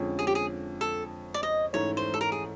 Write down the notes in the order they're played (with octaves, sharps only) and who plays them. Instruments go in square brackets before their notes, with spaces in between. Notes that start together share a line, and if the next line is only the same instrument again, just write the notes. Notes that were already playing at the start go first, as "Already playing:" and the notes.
Already playing: [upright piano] F2 D3 F3 G#3 C#4
[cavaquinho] G#4
G4
G#4
A4
D5
D#5
[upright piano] G#2 E3 A3 C#4 [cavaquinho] C#5
[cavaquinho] C5
A4
A#4
G#4